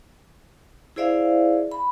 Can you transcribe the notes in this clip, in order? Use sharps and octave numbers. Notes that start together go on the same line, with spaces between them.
E4 G#4 C5 D5 E5 F5
B5